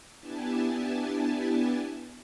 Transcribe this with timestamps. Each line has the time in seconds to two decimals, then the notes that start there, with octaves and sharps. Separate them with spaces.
0.19 B3 D4 E4 G4 G#5 A5